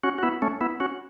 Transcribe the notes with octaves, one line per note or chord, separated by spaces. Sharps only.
C#4 F#4
F#4
B3 E4
A3 C#4
B3 E4
C#4 F#4